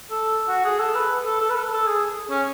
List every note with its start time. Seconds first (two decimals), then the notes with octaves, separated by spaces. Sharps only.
0.11 A4
0.48 F#4
0.65 G#4
0.80 A4
0.95 B4
1.26 A4
1.41 A4
1.49 B4
1.56 A4
1.72 A4
1.87 G#4
2.30 C#4